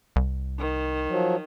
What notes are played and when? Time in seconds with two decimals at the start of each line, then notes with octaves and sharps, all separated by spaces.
0.16 C2
0.59 D#3
1.09 F3 F#3